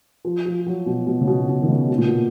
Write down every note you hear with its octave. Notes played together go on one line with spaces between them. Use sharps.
F3
F3
F#3
B2
B2
C#3
B2
B2
D#3
C#3
B2
A#2
B2